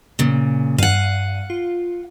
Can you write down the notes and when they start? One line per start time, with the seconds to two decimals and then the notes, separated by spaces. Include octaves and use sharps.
0.19 A#2 C#3
0.78 G2 F5 F#5 D#7
1.50 F4